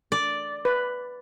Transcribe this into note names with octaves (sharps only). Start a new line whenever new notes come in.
D5
B4